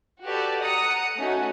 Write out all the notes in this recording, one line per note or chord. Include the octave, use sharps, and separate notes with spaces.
F#4 G4 A4 B4 D5
F#5 A#5 D#6 C#7
A3 C#4 D#4 F#4